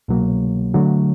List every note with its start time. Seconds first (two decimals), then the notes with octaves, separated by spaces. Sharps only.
0.08 C2 B2 F#3 A#3
0.74 D3 F#3 A3